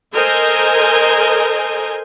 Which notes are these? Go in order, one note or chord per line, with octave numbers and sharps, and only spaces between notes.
A4 A#4 C5 D#5 G#5